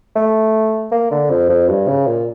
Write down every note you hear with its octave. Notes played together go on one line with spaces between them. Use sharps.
A3
A#3
D3
F2
F2
G2
C#3
A#2